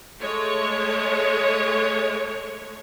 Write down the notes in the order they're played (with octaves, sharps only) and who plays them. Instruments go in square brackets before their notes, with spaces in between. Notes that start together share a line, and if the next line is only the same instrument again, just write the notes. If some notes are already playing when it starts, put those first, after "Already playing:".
[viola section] G#3 A3 C#5